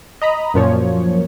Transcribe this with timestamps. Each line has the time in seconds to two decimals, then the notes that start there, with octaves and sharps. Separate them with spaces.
0.22 D#5 A#5 B5
0.54 F#2 A#2 F3 C#5